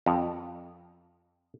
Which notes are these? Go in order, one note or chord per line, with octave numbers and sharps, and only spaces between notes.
F2